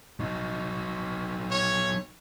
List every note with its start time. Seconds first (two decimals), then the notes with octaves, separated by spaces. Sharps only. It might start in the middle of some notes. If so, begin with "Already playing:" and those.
0.20 F#3 D#4
1.51 C#5